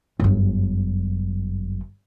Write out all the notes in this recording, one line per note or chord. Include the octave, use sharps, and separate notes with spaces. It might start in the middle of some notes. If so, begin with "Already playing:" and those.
G1 F#2